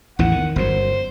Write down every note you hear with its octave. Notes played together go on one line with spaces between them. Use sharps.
A1 E2 E3 F#5
D#3
G1 F#2 F#3 C5